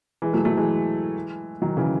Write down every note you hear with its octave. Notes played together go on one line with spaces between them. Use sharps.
E3 G#3
F#3 A3
F#3 A3
E3 G#3
D#3 F#3
C#3 E3